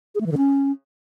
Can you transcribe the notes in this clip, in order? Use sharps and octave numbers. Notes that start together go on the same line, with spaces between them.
G#4
A3
E3
D3
C#4